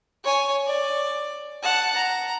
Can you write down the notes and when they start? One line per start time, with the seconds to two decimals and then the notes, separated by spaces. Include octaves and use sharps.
0.24 C#5 G#5
0.67 D5
1.63 F#5 A5
1.96 A#5